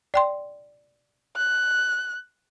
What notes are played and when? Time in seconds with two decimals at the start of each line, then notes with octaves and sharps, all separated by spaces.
0.14 D5 G5 C6
1.36 F#6